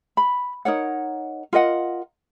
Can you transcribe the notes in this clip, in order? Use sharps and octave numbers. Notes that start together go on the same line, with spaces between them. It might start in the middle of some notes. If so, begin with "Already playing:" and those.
B5
D#4 A#4 C#5 F#5
F4 A#4 D#5 F#5